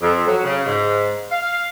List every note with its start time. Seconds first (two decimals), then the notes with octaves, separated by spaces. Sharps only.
0.01 F2
0.26 F#3
0.44 C#3
0.66 G#2
1.30 F5